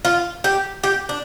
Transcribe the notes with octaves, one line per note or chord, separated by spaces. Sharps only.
F4
G4
G4
D4